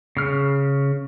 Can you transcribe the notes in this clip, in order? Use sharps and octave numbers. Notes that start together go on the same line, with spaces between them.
C#3 F6